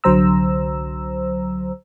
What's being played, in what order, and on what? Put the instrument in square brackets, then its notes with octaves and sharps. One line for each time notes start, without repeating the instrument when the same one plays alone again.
[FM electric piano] C2 D3 F#3 C5 A#5 E6